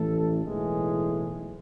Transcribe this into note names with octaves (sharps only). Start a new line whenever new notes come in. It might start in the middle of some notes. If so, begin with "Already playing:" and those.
Already playing: A1 A2 E3 A3 A4
B1 A2 E3 G#3 G#4